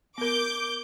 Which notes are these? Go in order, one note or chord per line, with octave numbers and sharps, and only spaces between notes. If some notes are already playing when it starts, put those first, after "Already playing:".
B3 A#4 D6 G6